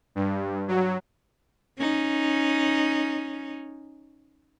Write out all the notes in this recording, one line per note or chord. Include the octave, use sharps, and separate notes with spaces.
G2
F#3
C#4 D#4